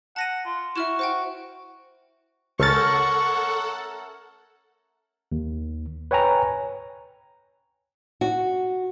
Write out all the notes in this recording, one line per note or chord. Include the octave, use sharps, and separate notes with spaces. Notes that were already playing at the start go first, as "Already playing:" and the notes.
F#5 A5 A#6 D#7
F4
E4 F#4 E5 F6 E7
C5 F#5 G5
C#2 A3 C#4 A4 A#4 F#5 C#6 A6
D#2
B4 C#5 G5 G#5 A#5
F#4